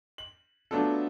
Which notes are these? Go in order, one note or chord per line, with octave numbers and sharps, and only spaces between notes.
F#7
F#3 A3 B3 D4 F4 A4